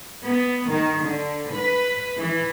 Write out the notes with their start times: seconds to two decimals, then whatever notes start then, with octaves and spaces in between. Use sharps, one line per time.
0.24 B3
0.70 D#3
1.04 D3
1.55 B4
2.19 E3